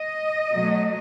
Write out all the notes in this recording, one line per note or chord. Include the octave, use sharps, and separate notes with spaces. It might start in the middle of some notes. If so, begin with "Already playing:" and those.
Already playing: D#5
B2 F#3 A3